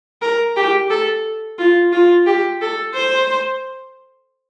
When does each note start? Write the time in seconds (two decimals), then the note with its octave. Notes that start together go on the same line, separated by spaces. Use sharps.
0.22 A#4
0.56 G4
0.90 A4
1.58 F4
1.93 F4
2.27 G4
2.62 A4
2.95 C5